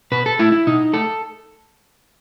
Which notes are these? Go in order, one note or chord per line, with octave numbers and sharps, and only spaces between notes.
B2 B4
A4
A3 E4
E4
B2 D#4
A3 A4